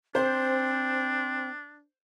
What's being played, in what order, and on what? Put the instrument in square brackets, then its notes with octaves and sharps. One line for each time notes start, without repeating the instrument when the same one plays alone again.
[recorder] C4 [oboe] D4 [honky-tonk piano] C5